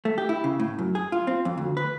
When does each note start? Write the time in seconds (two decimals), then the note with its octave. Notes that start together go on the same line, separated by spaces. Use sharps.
0.05 A3
0.18 G4
0.29 E4
0.44 C#3
0.60 A2
0.79 F#2
0.95 G#4
1.12 F4
1.27 C4
1.45 F2
1.58 D2
1.77 B4